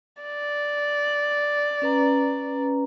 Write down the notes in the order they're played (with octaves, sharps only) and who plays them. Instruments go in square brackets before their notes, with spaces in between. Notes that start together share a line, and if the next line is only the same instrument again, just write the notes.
[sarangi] D5
[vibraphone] C#4 B4 A#5